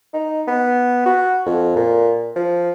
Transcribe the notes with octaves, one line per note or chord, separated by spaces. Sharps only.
D#4
B3
F#4
F2
A#2
F3